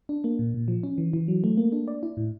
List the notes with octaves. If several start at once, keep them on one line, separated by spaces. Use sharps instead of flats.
D4
A#3
A#2
A#2
F3
C#4
E3
E3
F#3
A3
A#3
D4
D5
E4
A2